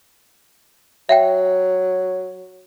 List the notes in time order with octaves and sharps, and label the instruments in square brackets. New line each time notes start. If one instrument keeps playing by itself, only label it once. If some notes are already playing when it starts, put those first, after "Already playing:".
[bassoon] F#3 [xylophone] E5 F#5 G5